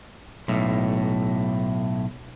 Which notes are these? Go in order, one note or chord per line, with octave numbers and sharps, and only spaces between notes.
B1 A2